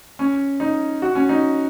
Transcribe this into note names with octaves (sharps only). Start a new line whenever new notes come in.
C#4
D#4
F#4
C#4
D#4